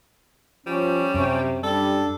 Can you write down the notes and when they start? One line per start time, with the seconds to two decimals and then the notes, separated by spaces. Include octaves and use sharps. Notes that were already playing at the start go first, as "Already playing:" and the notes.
0.66 F3 G3 C#4
1.14 F#2 C3
1.63 G3 D4 A4